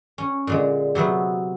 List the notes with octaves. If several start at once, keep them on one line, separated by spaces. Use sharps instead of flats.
C#4
A#2 D3 G#3
C3 F#3 B3 B4